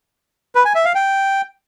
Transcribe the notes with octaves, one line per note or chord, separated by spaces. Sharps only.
B4
G#5
E5
F5
G5